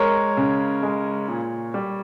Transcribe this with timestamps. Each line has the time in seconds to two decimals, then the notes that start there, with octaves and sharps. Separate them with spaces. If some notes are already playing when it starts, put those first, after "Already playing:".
Already playing: G#3 A#4 C#5
0.37 C#3
0.83 G#3
1.28 A#2
1.74 G3